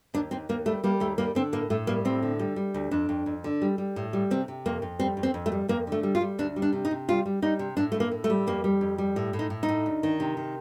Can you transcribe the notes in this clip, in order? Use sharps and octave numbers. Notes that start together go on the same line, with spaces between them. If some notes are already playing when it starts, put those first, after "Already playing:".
D#2 D4
D#2 C4
D#2 A#3
G3 A3
G3 A#3
D#2 A3
G3 A#3
D3 C4
A2 A#3
A2 A3
G3 A#3
A2 C4
D3
G3
G3
D2
F2 D4
F2
F2
D3
G3
G3
A2
G3
C3 C4
C3
F2 A#3
F2
G3 C4
F2
C4
F2
A3
G3
F2 A#3
D3 A3
G3
F4
G3
D2 D4
G3
D4
C3
D#4
C3
G3 F4
G3
G3 D#4
C3
A2 D4
A2 A3
A#3
A2
A3
G3
F2 A#3
G3
F2
G3
A2
A2
D#4
A2
D#4
A2
D2
D#3
C3
D#3